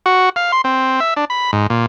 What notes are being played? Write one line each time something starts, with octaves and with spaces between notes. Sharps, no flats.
F#4
F5
C6
C4
E5
D4
B5
G#2
A#2